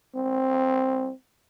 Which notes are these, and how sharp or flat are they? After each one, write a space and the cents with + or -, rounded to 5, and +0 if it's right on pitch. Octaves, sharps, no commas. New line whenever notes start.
C4 +5